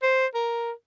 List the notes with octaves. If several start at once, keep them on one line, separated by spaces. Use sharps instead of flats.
C5
A#4